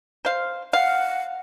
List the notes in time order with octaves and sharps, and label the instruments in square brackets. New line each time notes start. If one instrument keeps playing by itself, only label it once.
[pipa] C5 F5
[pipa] F5 [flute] F#5